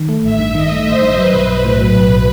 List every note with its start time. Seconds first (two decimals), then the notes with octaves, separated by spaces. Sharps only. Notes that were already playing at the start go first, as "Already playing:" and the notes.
Already playing: D#3
0.09 A3
0.24 A1 E5
0.39 G2
0.55 D#3 D#5
0.71 A3
0.86 A1 C5
1.03 G2
1.17 F#3 B4
1.33 B1
1.49 B1
1.65 A2
1.81 F#3
1.95 B1